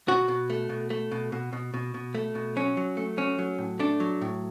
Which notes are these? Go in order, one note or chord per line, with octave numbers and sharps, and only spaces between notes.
B2 F#4
B2
A3
B2
A3
B2
B2
B2
B2
B2
A3
B2
F#3 C#4
F#3
A3
F#3 C#4
F#3
A2
A3 D4
F#3
A2